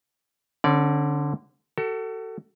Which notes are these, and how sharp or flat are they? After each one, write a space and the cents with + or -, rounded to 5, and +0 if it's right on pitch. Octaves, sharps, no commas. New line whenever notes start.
D3 +0 C#4 -40 D5 -15
F#4 +35 A4 +25